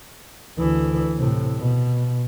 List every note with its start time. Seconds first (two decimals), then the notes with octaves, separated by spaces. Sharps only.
0.58 D2 E3
1.18 A2 C3
1.58 B2